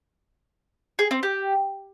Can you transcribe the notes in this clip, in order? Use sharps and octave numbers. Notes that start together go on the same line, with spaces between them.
G#4
C4
G4